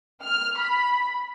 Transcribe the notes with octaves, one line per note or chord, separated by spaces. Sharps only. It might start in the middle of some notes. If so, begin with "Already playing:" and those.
F6
B5